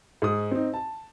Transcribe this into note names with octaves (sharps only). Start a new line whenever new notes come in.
G#2 D#6
C4 D#4
A5